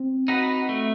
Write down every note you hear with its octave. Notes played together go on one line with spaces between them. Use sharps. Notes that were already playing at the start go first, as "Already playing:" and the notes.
Already playing: C4
D#4 F#4 B4
A3